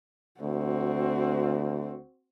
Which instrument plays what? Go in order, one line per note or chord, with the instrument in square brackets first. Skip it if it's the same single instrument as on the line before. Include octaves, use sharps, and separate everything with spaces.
[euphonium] D2 [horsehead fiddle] C4 F#4